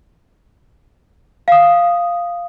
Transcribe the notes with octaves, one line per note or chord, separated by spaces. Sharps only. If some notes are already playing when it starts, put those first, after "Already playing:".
F5 D#6